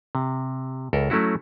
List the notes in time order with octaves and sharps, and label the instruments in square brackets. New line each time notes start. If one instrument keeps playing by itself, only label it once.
[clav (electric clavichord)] C3
C#2 A4 A#4
F#3 A3 C#4 E4 F#4